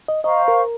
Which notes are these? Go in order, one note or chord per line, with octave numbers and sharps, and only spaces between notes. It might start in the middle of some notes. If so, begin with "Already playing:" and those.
D#5
C5 D#5 F5 A#5 C#6
A#4